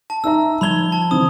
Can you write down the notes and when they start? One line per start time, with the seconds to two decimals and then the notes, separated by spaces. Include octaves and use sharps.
0.10 A5
0.24 D#4 E5 A#5 E6
0.61 F3 B5 G#6 F7 G7
0.92 A5
1.11 D3 E3 C4 D#6